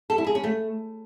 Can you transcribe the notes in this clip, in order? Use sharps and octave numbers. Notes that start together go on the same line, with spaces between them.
A4
E4
G#4
C#4
A3